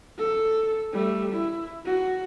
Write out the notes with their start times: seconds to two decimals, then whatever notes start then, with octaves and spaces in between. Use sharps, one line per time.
0.18 A4
0.93 G3 A3
1.33 E4
1.86 F#4